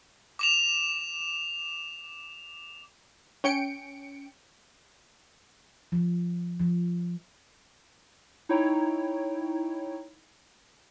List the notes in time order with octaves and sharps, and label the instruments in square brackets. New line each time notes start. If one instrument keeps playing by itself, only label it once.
[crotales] D6 E7 F7
[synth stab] C#4 G5 C#7 D7
[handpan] F3
F3
[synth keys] D#4 E4 C#5 G5